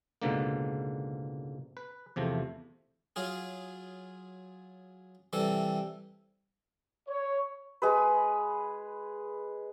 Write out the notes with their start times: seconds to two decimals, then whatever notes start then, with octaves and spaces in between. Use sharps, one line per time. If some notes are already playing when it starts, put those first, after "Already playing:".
0.22 C#2 G#2 B2 D3 A#3
1.77 B4
2.16 E2 C3 F3 A3
3.16 F#3 F4 G#4
5.33 C3 E3 G3 A4
7.09 C#5
7.82 G#3 G#4 B4